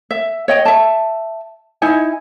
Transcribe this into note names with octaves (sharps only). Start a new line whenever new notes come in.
E5
C#5 D#5 G5
E5 A5
D#4 E4 G#5